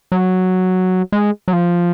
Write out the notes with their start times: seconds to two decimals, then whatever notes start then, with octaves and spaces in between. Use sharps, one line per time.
0.12 F#3
1.12 G#3
1.48 F#3
1.53 F3